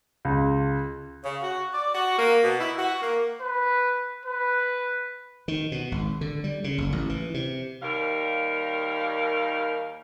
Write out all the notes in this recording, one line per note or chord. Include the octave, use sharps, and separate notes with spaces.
C#2
C#3
F#4
D5
F#4
A#3
B2
E4
F#4
A#3
B4
B4
D#3
B2
G#1
D3
G3
C#3
F#1
A1
E3
C3
D#2 D#3 G3 A#4 F5